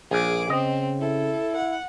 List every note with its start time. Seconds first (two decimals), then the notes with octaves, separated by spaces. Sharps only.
0.11 A#1 G#4 D6
0.50 C#3 C4 D#5
1.01 E4 A4
1.56 F#5